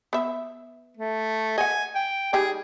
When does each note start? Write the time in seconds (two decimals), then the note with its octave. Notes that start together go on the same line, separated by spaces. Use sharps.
0.13 B3 E5
0.97 A3
1.58 D#5 F#5 G#5
1.95 G5
2.33 G3 D#4 G#4 G5